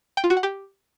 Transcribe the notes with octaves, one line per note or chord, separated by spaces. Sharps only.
G5
F4
F#4
F#5
G4